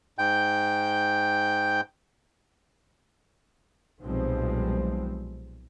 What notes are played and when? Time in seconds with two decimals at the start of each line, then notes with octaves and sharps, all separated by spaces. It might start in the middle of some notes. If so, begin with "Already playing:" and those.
0.19 G#2 G5 G6
4.03 B1 A#2 F3 G3 G#3 C4